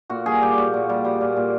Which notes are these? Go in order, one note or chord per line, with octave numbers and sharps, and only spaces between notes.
A#2 F#4
G3 G#4
G3 G4
A#2 F#4
A#2
G3
G3
A#2
A#2